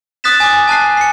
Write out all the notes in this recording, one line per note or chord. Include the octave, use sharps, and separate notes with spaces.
D#6 F#6 A6 B6 E7
G#5 D6
G#5 A5 F#6 C7
C7 C#7